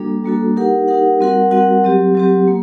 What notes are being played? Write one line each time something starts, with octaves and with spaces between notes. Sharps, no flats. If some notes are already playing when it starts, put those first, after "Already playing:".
Already playing: G3 A#3 D4 F#4 A4
G3 A#3 D4 F#4 A4
D#4 G4 A#4 F#5
D#4 G4 A#4 F#5
G3 C4 F#4 A#4 F#5
G3 C4 F#4 A#4 F#5
F#3 C4 G4
F#3 C4 G4
A#3